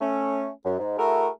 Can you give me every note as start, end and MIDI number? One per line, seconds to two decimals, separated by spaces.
0.01 0.49 57
0.01 0.49 61
0.65 0.78 42
0.79 0.97 44
0.98 1.29 57
0.98 1.29 64
0.98 1.29 66
0.98 1.29 68
0.98 1.29 70